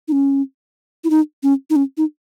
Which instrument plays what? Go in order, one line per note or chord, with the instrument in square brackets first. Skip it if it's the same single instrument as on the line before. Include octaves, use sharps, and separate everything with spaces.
[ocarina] D#4
C#4
E4
D#4
C#4
D#4
C#4
D#4